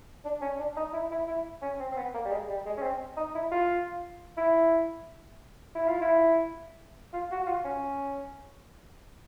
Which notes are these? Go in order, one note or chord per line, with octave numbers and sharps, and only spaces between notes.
D4
C#4
D4
D#4
E4
E4
E4
C#4
C4
C4
B3
A#3
G3
G#3
G3
G#3
C#4
C4
D#4
E4
F4
E4
E4
F4
E4
F4
F#4
F#4
F4
C#4